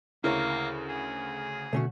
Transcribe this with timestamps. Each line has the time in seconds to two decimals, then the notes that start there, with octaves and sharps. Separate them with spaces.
0.24 D2 C#3 A#3 E4 A#4 C#5
0.89 G#4
1.73 B2 D3 A3 C#4 F#4